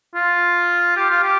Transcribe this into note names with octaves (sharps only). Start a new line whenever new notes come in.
F4
G4
F4
G4